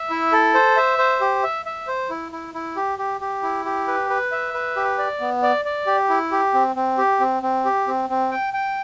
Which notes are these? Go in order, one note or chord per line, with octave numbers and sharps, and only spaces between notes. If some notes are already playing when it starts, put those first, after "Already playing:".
Already playing: E5
E4
A4
C5
E5
C5
G4
E5
E5
C5
E4
E4
E4
G4
G4
G4
E4
G4
B4
B4
E5
B4
G4
D5
B3
D5
D5
G4
E4
G4
C4
C4
G4
C4
C4
G4
C4
C4
G5
G5